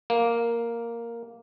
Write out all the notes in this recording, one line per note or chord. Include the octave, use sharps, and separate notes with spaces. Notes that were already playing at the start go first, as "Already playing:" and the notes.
A#3